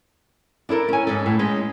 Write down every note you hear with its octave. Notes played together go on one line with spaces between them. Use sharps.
D4 E4 A4 A#4
C#4 G#5
G#2 C#4 A4
A2
G#3 C#4